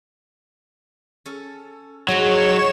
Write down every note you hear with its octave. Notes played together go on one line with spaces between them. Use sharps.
C#4 A4
G#2 F3 F#3 G#3 C#5 E7